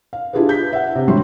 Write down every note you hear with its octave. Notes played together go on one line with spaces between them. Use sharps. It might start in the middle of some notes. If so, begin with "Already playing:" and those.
F5
D4 E4 F4 G4 G#4 B4
G6 B6
E5 F#5
C3
A1 D3 F#3 G3 F#4 C6